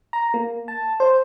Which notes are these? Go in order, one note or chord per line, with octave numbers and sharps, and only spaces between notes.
A#5
A#3
A5
C5